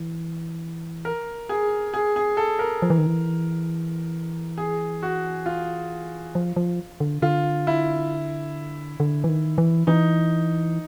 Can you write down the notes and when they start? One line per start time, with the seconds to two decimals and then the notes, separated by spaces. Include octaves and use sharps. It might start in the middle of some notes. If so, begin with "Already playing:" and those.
Already playing: E3
1.05 A#4
1.49 G#4
1.94 G#4
2.16 G#4
2.37 A4
2.59 A#4
2.82 F3
2.90 E3
2.98 D#3
3.07 E3
4.58 G#4
5.02 F#4
5.46 F4
6.35 F3
6.56 F3
7.00 D3
7.22 D3 F4
7.67 E4
9.00 D3
9.24 E3
9.29 D#3
9.58 E3
9.87 E3 D#4